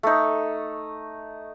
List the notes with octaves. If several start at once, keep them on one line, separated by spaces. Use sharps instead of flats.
A3 D#4